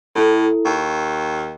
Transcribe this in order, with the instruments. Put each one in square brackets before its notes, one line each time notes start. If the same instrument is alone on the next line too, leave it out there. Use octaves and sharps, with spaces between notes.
[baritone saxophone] A2 [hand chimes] E4 A4
[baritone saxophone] D#2 [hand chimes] C#6